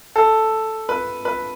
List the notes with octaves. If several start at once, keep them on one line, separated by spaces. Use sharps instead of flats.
A4
B4
B4